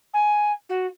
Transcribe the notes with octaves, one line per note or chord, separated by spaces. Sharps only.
G#5
F#4